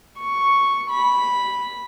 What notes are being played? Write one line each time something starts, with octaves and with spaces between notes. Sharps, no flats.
C#6
B5